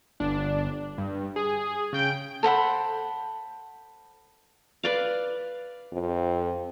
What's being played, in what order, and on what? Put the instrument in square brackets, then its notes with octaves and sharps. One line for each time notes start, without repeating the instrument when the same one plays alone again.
[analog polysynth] G1 D4
G2
G#4
C#3 G5 G6 D7
[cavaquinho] A4 C5 F#5 B5
[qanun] B4 D5 F5
[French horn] F2